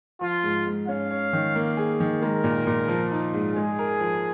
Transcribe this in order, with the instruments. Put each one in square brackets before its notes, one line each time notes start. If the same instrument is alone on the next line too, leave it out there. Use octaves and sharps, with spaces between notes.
[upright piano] F3 [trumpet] F4
[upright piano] G#2
G#2
[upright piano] C#4 [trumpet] F5
[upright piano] C#5
D#3
A#3
G#4
D#3
[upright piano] G#3 [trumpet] A#4
[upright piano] A#2
A#2
F3
D#4
G#2
[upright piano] G#3 [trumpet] G#4
[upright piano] A#4
F3